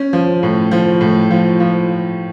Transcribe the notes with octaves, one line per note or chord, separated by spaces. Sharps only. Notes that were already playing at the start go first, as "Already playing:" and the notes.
Already playing: C#4
F3
A2
F3
A2
F3
F3